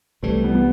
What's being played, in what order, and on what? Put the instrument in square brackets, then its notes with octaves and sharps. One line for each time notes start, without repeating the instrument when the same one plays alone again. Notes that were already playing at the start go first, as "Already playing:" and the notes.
[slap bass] C2 C3 E3 G3 [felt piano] A3
[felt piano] B3
B3